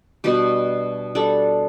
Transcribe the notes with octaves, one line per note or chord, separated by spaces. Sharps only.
B2 G3 D4 G4
G3 D4 A4